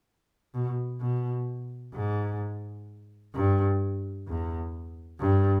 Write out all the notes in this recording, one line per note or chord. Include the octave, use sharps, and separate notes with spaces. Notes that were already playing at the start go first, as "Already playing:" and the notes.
B2
B2
G#2
G2
E2
G2